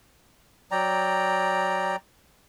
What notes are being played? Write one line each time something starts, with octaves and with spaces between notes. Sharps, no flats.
F#3 D5 G5 A#5